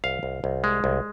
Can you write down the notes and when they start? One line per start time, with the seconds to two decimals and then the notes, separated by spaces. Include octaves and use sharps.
0.04 C2 F5
0.23 C2
0.44 C2
0.64 G#3
0.84 C2